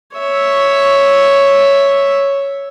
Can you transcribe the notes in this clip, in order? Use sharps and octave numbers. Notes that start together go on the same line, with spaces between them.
C#5 E5